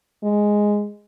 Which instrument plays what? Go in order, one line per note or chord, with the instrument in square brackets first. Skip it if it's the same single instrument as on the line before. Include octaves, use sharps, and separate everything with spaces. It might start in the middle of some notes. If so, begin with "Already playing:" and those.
[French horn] G#3